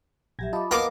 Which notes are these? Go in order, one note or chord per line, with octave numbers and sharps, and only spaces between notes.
A#1 F#3 G4 E5 G#6 A#6
F4 D#5 A5 B5 D6
A#3 B3 A#4 F5 D6